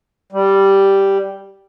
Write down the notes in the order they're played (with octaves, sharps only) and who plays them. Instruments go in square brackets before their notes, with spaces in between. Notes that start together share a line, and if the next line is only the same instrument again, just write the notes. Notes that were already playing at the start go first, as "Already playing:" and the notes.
[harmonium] G3